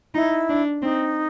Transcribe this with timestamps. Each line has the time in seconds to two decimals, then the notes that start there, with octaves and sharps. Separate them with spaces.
0.14 D#4 E4
0.49 D4
0.82 C4 D#4